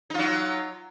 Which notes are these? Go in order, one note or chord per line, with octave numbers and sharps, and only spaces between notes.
F#3 D#4 F4